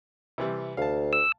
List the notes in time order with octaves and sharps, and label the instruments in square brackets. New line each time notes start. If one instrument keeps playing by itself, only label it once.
[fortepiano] C3 E3 G3
[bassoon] D2 [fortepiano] F5 A5
[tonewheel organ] E6